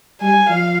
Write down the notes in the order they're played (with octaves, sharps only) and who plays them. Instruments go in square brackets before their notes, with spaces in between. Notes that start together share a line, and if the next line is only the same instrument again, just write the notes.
[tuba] G3 [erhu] G#5
[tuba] F3 [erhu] F5